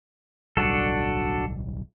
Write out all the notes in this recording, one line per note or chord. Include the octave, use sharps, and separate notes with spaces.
D1 B1 G3 D4 F#4 A4